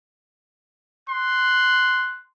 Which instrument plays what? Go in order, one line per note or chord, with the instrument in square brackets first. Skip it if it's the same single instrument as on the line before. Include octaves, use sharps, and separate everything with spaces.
[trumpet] C6 [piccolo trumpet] F#6